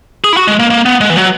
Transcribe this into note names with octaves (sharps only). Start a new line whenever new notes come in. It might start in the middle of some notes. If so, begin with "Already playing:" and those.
G#4
E4
F#4
G#3
A#3
A#3
B3
G#3
E3
F#3